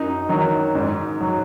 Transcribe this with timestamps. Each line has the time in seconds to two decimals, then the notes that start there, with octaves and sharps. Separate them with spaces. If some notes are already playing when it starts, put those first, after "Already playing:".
Already playing: F#2 D#4
0.29 D#3 F#3
0.75 G#2
1.20 F#3